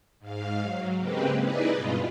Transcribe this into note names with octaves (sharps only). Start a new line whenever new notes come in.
G#2 F5
F#3
C#3 G#3 A#3 C4 G4 B4
D#4 E4 G#4 B4 D5 D#5
G2 B2 F4